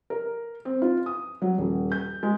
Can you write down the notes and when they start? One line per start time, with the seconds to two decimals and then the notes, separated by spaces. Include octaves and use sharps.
0.10 A#4
0.65 C4
0.82 F4
1.06 D#6
1.42 F#3
1.58 D#1
1.92 G6
2.23 G#3